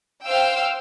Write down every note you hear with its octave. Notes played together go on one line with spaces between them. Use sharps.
C5 F5 G5 E6